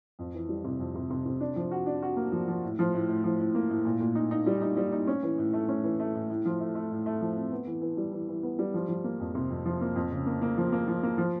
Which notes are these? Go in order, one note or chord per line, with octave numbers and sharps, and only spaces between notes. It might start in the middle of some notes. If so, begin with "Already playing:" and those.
F2
E3
G3
C3
F2
C3
C3
C3
D4
F3
F#4
D4
F#4
A#3
F3
F3
A2
F3
A2
A2
F3
A2
A#3
A2
A#2
A#2
D#4
D#4
G3
D#4
G3
D#4
C#4
E3
A2
A3
C#4
E3
A3
A2
A2
F3
A3
A3
A2
A3
F3
C4
B3
E3
E3
G3
E3
E3
B3
G3
F3
F3
A#3
F2
C3
F2
F3
A#3
F2
C#3
A#3
A#3
F3
A#3
F3
A#3
F3